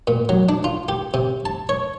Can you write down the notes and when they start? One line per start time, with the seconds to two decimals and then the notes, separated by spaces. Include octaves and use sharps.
0.07 A#2
0.29 F#3
0.49 D4
0.64 F4
0.89 G4
1.14 C3
1.45 A5
1.69 C#5